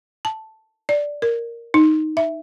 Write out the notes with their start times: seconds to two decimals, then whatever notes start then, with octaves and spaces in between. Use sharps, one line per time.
0.25 A5
0.89 D5
1.22 A#4
1.74 D#4
2.17 E5